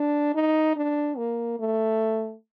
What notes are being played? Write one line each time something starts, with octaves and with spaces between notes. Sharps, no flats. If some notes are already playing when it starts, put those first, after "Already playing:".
Already playing: D4
D#4
D4
A#3
A3